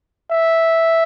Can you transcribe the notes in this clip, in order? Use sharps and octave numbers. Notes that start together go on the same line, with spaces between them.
E5